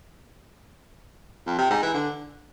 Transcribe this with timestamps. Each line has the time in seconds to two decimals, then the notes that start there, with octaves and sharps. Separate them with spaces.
1.46 F2
1.58 C3
1.70 G#2
1.82 E3
1.94 D3